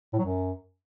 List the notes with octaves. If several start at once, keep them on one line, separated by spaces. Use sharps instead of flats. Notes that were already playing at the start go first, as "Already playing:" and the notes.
A2
F#3
F#2